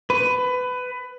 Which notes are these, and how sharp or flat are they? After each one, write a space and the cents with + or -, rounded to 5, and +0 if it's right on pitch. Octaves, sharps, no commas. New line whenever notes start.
B4 +20